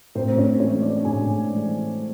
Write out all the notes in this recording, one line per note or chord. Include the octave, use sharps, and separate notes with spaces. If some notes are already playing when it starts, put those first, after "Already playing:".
A2 C4 C5
C#4 C#5
E3 G#3 C#4 C#5
D4 D5
A2 G#4 G#5
E3 G#3